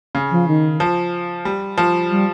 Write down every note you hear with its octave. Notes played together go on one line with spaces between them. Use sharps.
C#3
F3
D#3
F3
G3
F3
G3